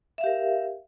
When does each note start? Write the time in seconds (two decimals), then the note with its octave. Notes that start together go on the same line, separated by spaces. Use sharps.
0.18 E5
0.21 F5
0.24 G4
0.26 A#4